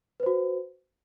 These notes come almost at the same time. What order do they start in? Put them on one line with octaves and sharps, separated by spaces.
B4 C5 F#4